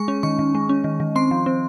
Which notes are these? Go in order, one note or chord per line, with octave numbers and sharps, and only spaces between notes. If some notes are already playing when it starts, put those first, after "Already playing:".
Already playing: G#3 C#6
C#4
D#3 C#6
D#3
G#3
C#4
D#3
D#3
C4 C6
F3
C4